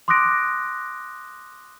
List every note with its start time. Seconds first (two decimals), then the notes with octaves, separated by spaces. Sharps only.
0.08 C6 D6 D#6 F#6 A#6 D7